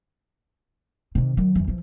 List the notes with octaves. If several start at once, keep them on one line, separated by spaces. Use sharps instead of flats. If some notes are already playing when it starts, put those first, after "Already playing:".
C3 D#3
D#3 F#3
E2 E3
E3 F3